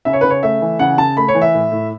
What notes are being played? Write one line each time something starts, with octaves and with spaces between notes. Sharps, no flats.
C#3 E5
C#5
B4
C#3
C#5
A3 E5
E3
C#3 F#5
C#3 A5
A3 B5
C#5
E3
E5
A2
A2